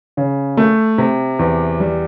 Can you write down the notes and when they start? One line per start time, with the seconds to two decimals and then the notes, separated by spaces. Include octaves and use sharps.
0.17 C#3
0.57 A3
0.98 C3
1.39 E2
1.80 G3